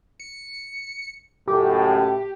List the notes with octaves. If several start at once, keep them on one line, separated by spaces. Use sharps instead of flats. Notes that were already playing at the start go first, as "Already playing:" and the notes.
C#7
C#2 F#2 A2 G4